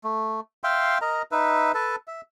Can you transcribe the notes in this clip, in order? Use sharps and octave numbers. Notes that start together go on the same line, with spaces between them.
A3
E5 F5 G5 C6
A#4 D#5 A#5
D#4 B4 E5
A4 B4 A5
E5